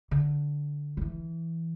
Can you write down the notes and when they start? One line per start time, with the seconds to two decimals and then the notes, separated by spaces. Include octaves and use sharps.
0.11 D3
0.97 F#3
1.01 E3